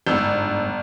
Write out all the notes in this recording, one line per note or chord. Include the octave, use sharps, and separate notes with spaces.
G1 G#2 E6 G6